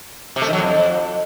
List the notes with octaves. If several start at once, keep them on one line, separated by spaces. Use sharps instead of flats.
C3
A3
D#3
F#3
F2